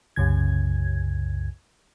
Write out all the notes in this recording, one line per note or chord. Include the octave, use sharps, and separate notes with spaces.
C2 F#2 C#3 G#6